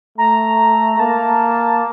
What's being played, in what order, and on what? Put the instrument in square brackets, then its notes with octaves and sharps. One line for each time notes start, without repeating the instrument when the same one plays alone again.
[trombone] A3 [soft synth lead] A#5
[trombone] A#3 [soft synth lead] A5